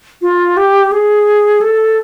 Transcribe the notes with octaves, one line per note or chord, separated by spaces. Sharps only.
F4
G4
G#4
A4